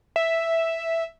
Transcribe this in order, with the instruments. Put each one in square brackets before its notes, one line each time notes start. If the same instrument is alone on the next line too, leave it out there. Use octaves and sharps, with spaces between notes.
[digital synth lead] E5